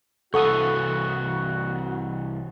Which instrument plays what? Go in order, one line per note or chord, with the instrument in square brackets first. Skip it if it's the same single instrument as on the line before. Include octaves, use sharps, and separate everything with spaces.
[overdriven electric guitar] C2 E3 [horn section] F#4 [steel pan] A4 F#5 D#6 [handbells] C#6